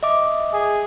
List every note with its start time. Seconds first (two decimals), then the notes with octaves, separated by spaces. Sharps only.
0.03 D#5 E5 D6
0.54 G#4